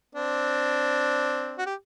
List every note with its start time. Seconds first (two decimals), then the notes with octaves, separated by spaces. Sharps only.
0.15 C4 D4
1.58 F#4
1.66 G4